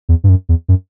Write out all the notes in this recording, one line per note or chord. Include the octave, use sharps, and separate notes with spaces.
E2
G2
F#2
E2
F#2